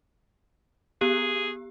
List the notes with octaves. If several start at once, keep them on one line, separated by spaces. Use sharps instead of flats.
B3 G4 G#4